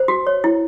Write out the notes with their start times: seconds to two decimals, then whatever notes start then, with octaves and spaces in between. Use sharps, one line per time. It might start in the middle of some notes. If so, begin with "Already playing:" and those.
Already playing: C5
0.08 F#4
0.27 C#5
0.44 E4